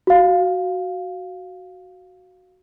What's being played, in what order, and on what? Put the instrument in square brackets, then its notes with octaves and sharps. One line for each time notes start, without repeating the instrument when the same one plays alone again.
[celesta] F#4 F5